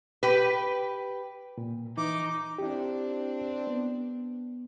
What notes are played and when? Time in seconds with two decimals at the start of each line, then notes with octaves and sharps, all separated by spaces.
0.23 G4 B4
1.58 A#2
1.98 E3 D#4 D6
2.58 C4 D4 E4 G4
3.67 B3